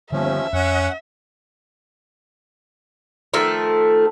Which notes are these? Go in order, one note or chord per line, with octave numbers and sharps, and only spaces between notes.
D#2 D3 F3 G3 B3 C#4 E5
F2 C#4 F#5
D#3 F3 A3 A4